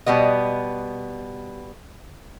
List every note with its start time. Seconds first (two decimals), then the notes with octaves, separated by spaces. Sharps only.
0.06 B2 G3 B3 D#5